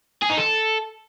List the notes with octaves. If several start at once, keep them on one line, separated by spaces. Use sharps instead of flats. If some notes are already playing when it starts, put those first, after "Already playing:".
G#4
D#4
A4